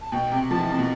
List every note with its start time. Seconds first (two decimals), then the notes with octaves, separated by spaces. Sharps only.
0.01 A5
0.12 B2 G5
0.32 C3
0.50 F3 A5
0.60 E3
0.69 C3
0.79 B2